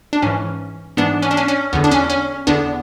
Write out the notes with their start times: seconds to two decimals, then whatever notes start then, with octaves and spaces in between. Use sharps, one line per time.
0.13 D4
0.22 G#2 E3 C#4
0.97 G#2 E3 B3 D4
1.22 C#4
1.31 D4
1.37 C#4
1.48 C#4
1.73 E2 D3 B3
1.84 D4
1.91 C#4
2.10 C#4
2.47 E2 D3 B3 D4